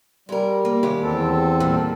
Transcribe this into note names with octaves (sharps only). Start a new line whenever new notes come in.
G3 G#3 A#4
A#3
D#2 G#3 G4
E2 C4 A4
A#2 G3